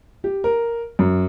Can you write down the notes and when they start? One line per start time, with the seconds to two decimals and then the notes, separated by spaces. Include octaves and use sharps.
0.24 G4
0.44 A#4
0.99 F#2